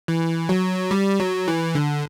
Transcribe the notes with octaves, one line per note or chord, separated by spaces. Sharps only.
E3
F#3
G3
F#3
E3
D3